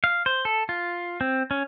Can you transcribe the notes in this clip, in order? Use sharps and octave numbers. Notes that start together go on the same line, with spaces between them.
F5
C5
A4
F4
C4
C#4